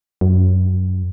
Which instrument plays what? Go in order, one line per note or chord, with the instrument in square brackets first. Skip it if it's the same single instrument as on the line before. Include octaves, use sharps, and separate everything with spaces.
[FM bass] F#2